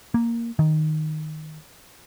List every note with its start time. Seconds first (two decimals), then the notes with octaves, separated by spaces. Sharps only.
0.14 A#3
0.59 D#3